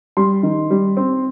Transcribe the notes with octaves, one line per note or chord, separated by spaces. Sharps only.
G3 C6
D#3
G3
C4